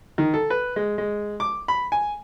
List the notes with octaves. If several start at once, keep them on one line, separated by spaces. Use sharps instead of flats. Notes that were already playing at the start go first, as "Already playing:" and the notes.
D#3
A4
B4
G#3
G#3
D6
B5
G#5